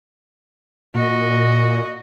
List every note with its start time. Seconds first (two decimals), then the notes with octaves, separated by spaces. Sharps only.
0.95 A#2 F#4 D#5